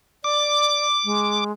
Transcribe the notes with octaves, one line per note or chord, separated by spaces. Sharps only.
D5 D6
G#3